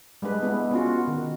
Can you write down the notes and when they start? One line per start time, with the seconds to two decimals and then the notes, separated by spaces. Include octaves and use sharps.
0.22 G3 G#3 D4 B4
0.43 G#3 B3 E4
0.71 B3 C#4 F4 F#4
1.08 D#3